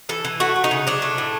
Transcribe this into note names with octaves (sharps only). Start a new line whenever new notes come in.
E3 A4
E3
A3 F#4
A3
D#4
C#3
F#3 D4
A3
A2